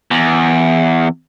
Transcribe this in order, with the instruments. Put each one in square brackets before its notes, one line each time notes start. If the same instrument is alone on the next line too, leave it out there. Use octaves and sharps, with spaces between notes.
[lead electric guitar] E2